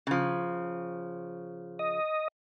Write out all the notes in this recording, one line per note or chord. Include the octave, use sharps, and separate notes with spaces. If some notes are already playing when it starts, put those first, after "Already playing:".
C#3 F3
D#5